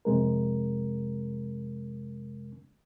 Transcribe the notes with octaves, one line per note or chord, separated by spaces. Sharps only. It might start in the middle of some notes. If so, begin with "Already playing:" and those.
F2 C3 G#3 A#4